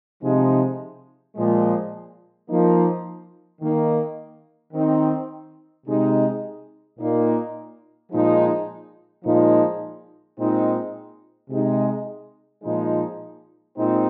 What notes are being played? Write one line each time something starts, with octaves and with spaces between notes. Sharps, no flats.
C3 F3 G#3 D#4
A#2 F3 G#3
F3 A#3 D#4
D#3 A#3 D#4
D#3 C4 D#4
C3 G#3 D#4
A#2 A#3 D#4
A#2 F3 G#3 D#4
A#2 F3 G#3 D#4
A#2 G#3 C4 D#4
C3 G#3 D#4
A#2 F3 G#3 D#4
A#2 G#3 C4 D#4